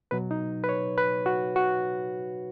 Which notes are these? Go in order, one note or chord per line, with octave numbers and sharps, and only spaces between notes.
B2 F#3 B4
D#4
B4
C#5
B4
F#4
F#4